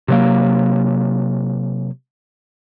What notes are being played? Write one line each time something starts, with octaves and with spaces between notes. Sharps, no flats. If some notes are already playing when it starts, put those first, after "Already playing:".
C3 F#3 A#3